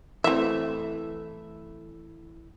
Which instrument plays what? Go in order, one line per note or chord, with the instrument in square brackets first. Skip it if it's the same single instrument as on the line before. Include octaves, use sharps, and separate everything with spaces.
[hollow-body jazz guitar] E3 A3 [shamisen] C4 E5